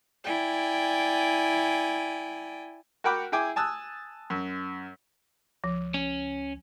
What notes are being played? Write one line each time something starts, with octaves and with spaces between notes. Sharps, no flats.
E4 D5 G5 G#5
F#4 A#4 F#5 G5 B5 D6
E4 G#4 G5 G#5 D6
G#5 A5 D#6 E6 F#6
F#2
C#2 F3
C#4